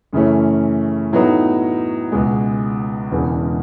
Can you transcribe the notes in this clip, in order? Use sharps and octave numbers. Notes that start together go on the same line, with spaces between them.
F#2 C#3 E3 A3 C#4
A2 F#3 B3 D#4
C#2 B2 G#3
E1 E2 C#3 E3 B3